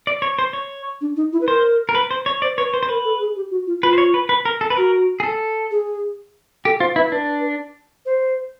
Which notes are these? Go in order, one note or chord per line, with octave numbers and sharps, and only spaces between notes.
D5
C#5
C5
C#5
D4
D#4
E4
B4
A#4 C5
A#4
B4
C5
C#5
C5 D5
B4 C#5
B4 C5
C5
A#4 B4
A4
G#4
G4
F#4
F4
F4 B4
C5
C#5
B4
B4
A#4
A4
B4
F#4 A#4
G#4
A4
G#4
G4 A4
F4 C5
E4 B4
D4 B4
C5